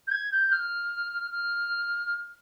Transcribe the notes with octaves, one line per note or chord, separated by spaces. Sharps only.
G6
G#6
G6
F6
F6